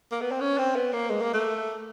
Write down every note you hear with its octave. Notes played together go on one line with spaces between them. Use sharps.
A#3
B3
C4
C#4
C4
B3
A#3
G#3
A#3
A3